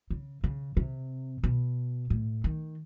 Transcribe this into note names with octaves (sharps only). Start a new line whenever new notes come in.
C#3
C#3
C3
B2
A2
D#3